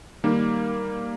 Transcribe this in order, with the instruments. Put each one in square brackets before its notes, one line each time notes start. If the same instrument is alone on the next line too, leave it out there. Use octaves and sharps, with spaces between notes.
[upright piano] D#3 [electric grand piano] G3 A#3